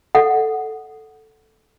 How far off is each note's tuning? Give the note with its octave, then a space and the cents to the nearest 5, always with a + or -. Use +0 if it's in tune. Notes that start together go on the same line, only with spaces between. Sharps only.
A4 +0 D#5 +0 F#5 +0